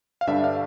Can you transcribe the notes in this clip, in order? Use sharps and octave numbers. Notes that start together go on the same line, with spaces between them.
F5
G2 D3 G3 D4 E5
F5